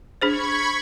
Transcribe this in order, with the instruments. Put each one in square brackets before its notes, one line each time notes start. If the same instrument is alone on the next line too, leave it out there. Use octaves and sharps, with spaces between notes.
[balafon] D4 G#4 C5 [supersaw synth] B5 C#6 G#6